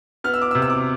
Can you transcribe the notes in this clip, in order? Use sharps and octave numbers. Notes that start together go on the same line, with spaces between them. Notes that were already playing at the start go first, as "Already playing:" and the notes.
B3 F6
E6
D6
E6
C3
E6
D6